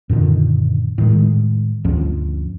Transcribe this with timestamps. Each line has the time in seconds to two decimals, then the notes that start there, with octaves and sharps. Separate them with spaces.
0.09 F#2 A#2 D3 D#3
0.98 A2 D#3 G#3
1.85 D2 G2 F3 C#4